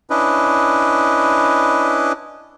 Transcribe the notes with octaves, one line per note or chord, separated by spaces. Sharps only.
C#4 D4 E4 B4 D#5